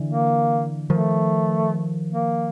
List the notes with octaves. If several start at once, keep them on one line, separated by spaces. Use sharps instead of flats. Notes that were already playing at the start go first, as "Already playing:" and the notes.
Already playing: D3 E3
A#3
D#3 F3 A3
A#3